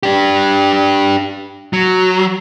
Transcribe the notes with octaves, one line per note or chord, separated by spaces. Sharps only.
D4 G4
F#3